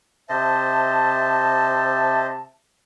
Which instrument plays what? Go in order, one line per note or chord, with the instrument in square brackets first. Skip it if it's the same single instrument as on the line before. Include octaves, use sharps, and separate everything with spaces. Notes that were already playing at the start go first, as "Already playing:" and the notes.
[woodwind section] C3 E5 A5 [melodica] C5 D#5